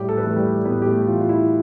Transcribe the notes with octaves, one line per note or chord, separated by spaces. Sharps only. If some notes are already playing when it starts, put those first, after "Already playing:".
Already playing: A2 G3 G4
A4
B4
E3 A3 A4
G3 G4
A2 B3 B4
G4
A3 A4
E3 F4
F4
E4